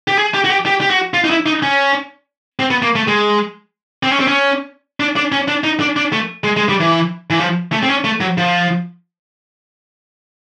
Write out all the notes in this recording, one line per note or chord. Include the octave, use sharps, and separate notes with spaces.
G4
G#4
G4
F#4
G4
G4
G4
F#4
F4
D#4
E4
D#4
C#4
C4
B3
A#3
A3
G#3
C4
C#4
C4
C#4
D4
D4
C#4
D4
D#4
D4
D4
A3
G#3
G#3
G3
E3
E3
F3
A3
C4
C#4
A3
F#3
F3